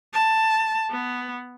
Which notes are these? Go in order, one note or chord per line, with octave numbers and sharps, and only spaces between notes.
A5
B3